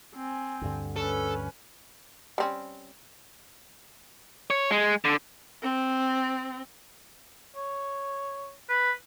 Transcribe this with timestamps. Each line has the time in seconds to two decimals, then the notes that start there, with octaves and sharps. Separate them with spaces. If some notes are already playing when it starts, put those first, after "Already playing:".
0.15 C4 G#5
0.61 D2 G2 D3
0.96 C#4 A4 B4
2.38 G3 C4 C#4
4.50 C#5
4.70 G#3
5.05 D3
5.62 C4
7.56 C#5
8.69 B4